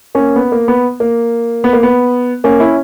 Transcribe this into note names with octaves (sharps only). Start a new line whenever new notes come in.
A#3 C#4
B3
A#3
B3
A#3
B3
A#3
B3
A#3 C#4
C#4 E4